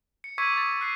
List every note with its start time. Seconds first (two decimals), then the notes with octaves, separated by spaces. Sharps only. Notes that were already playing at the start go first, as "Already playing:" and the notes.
0.24 C#7
0.38 C#6 D6 E6 G#6 B6 D#7
0.54 C#6 D#6 A6
0.81 F#6 C7 D#7